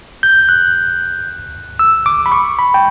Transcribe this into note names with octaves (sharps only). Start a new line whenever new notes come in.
G6
F#6
E6
D6
B5
C#6
B5
G5